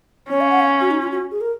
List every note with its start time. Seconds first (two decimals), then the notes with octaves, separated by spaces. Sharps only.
0.30 C#4 C#5
0.40 F5
0.50 F#5
0.60 F5
0.80 F#4
0.91 D#4
1.01 F4
1.11 F#4
1.31 G#4
1.41 A#4